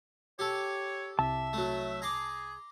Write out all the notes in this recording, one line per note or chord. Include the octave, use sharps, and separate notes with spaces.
G4 A4 C#5
C2 E5 A5
F#3 A3
G#4 A#5 C6 D6